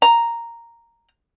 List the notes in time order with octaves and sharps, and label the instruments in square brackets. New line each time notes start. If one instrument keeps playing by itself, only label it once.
[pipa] A#5